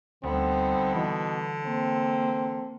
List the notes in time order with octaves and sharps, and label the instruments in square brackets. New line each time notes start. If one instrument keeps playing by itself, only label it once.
[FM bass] D2 [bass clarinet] D3 [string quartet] G3 B3 D#4 [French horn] C4
[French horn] B2 [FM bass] E3
[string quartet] A#3 [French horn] C4